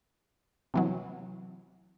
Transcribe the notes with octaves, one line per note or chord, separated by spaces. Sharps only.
C3 E3 F#3